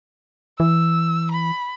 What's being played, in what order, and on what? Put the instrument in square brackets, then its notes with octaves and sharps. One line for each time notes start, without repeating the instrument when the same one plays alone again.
[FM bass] E3 [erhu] E6
[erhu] B5